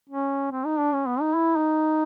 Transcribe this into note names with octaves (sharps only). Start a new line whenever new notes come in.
C#4
C4
D#4
D4
C#4
B3
D#4
E4
D#4